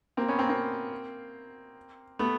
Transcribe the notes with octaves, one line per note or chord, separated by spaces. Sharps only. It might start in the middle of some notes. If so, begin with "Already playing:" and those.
A#3 C4
B3 C#4
A#3 C4
A#3 C4
A3 B3